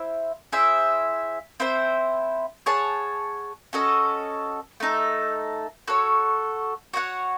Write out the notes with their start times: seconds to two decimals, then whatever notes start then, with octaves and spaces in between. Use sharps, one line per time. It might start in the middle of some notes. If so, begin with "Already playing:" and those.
Already playing: E4 C5 E5
0.52 E4 G#4 C5 E5
1.60 C4 E4 C5
2.66 G#4 C#5 F#5 A5
3.73 C#4 F#4 A4 D#5
4.80 A3 D#4 A4
5.88 F#4 A4 C#5
6.94 F#4 C#5 F#5